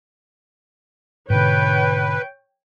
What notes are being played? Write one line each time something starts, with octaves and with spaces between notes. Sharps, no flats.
G#2 B2 D3 B4 C#5 G5